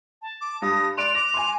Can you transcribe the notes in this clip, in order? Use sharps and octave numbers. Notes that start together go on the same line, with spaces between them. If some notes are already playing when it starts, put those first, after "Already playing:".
A5
D6
G2 D#6 A#6
D5 C6 F#6 D7 F7
D6 A#6
G#5 C6